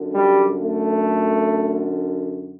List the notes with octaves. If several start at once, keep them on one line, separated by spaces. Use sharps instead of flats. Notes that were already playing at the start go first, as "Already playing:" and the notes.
Already playing: F#2 D3
G3
A3